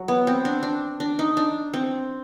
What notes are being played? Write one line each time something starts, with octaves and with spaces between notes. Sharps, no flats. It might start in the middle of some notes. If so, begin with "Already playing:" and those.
Already playing: F#3
B3
C4
D4
D4
D4
D#4
D4
C4